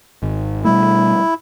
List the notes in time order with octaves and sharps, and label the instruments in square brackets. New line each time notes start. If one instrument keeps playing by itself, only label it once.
[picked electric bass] G#1
[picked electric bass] B2 G3 A3 [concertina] E4